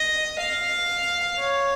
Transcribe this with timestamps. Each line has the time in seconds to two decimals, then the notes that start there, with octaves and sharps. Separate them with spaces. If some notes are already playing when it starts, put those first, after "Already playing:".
Already playing: D#5
0.39 F5
1.39 C#5